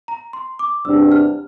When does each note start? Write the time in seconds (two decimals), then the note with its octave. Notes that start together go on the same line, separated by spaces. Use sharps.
0.08 A#5
0.33 C6
0.59 D6
0.85 E2 C3 G3 D4 E6
1.12 F6